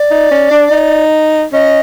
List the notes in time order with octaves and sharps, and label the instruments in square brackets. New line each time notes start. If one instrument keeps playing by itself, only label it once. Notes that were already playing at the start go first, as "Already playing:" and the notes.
Already playing: [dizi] D5
[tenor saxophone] D#4
C#4
D4
D#4
[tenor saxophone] C#4 [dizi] D#5